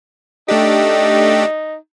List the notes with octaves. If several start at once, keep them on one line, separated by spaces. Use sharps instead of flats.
A3 D4 D#4 G4